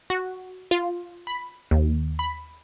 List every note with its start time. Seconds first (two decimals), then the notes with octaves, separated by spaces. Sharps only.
0.10 F#4
0.71 F4
1.27 B5
1.71 D#2
2.19 B5